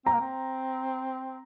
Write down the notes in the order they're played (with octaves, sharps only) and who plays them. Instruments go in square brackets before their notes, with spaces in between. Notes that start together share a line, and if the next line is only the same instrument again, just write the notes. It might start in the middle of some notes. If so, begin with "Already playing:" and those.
[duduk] C4 [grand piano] A#5
[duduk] A#3
C4